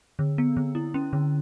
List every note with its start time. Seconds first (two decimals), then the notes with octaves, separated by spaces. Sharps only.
0.19 D3
0.38 B3
0.57 D3
0.75 E4
0.94 C#4
1.13 D3